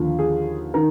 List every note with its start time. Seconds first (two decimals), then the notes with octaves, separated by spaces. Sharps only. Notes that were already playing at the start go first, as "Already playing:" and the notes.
Already playing: D#2 D3 F3
0.19 G#4
0.74 D#3 A#4